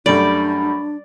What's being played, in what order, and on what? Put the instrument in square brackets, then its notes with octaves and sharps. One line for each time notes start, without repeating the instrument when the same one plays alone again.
[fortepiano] F#2 G3 A3 [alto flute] D4 [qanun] D5 [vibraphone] B5